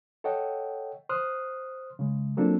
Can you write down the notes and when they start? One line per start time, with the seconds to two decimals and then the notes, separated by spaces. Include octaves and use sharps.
0.24 A4 C#5 D#5 F#5 G5
1.09 C5 C6 D#6 F6 F#6
1.99 C#3 G#3
2.37 F#3 A#3 C4 D4 F4 A4